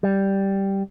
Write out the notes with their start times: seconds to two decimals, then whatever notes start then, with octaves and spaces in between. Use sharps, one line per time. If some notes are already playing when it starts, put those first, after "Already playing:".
0.03 G3